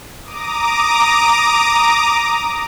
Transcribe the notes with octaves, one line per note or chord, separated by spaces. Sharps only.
A#5 D6 D#6